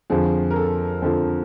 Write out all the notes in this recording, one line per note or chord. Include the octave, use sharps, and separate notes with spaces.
F2 D3 F3 G#4
A#4
A4
F2 D3 F3 A4